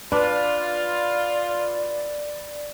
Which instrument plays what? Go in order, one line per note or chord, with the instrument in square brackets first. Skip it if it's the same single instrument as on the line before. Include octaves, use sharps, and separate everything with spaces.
[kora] D4 [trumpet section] F4 [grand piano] B4 [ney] D5